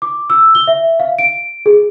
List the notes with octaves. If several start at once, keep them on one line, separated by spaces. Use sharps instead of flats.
D6
E6
G7
E5
F5
D7
G#4